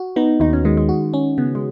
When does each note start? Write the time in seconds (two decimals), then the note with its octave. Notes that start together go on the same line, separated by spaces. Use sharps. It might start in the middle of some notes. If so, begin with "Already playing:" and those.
Already playing: F#4
0.16 B3 D#4
0.40 D#2 D#4
0.53 C#4
0.65 D#3 G#3
0.77 G#3
0.89 F#4
1.14 C#4
1.38 C#3 B3
1.55 G#3